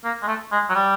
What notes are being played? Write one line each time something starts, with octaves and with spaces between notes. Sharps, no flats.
A#3
G#3
A3
G#3
F#3
G3